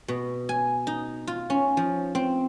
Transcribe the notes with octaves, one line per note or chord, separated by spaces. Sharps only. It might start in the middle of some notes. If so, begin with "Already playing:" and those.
B2
G#5
D#4
F4
C#4
F3
C4